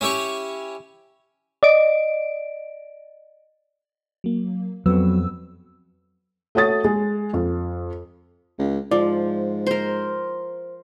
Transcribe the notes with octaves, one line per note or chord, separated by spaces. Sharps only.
C#4 E4 G4 C#5 C#6
D5 D#5 D7
F#3 A#3
F2 F#3 B3 B4 E6
A3 F#4 C#5 D#6 A6
G#3
F2
C#2
G#2 F3 D5
A#4 C5